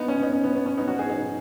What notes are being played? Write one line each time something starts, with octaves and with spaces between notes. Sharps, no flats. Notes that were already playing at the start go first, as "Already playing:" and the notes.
Already playing: B3 D#4
C#4
B3 D#4
C#4
B3
B3
C#4
B3 D#4
C#4 F#4
D#4 G#4
D#4 G#4